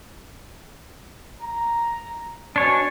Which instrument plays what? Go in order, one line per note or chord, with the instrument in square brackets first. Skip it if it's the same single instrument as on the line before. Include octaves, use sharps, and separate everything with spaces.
[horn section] A#5
[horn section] B2 G#5 [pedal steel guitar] D4 C#5